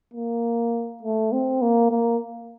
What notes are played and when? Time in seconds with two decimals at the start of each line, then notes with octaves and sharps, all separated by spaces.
0.13 A#3
1.03 A3
1.32 C4
1.62 A#3
1.91 A#3